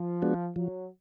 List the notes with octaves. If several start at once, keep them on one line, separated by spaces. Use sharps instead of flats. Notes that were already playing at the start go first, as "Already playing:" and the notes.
Already playing: F3
G#3 B3 D4 F#4
F3 F#3